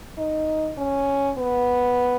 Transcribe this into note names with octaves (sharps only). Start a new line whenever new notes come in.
D#4
C#4
B3